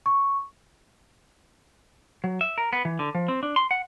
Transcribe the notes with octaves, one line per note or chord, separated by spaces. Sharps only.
C#6
F#3
E5
A#4
B3
E3
D3
F3
C4
D4
C6
F#5